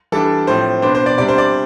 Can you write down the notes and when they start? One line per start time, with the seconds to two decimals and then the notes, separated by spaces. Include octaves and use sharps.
0.12 E3 G3 D4 A4
0.47 A2 F3 C4 C5
0.82 B2 B3 D4 C5
0.95 C5
1.06 D5
1.18 C3 G3 D4 D5
1.28 C5
1.38 D5